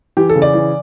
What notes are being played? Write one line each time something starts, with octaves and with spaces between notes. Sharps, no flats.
E3 G4
A4
C#3
D5
E3